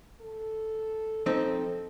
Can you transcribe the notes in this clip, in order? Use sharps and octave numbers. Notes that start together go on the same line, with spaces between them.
A4
F3 C4 D#4 A4